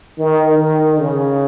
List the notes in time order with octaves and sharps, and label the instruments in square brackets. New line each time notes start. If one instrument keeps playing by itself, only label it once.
[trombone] D#3
D#3
C#3